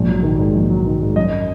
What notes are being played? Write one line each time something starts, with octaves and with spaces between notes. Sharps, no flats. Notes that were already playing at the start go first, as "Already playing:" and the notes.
Already playing: A#1 G#2
F#3
D#3
G#2
A#1
F#3
D#3
G#2
F#2 D#5